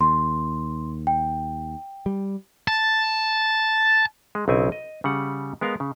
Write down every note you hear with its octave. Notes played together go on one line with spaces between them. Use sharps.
D#2 C6
G5
G3
A5
G#3
B1 C#3 C4 E4 G#5
D#5
C#3 G3 F#5
G#3 B3 A#4 F5
C#3